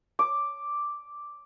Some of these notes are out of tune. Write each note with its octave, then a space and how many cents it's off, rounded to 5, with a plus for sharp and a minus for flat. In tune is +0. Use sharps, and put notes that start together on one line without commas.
D6 +0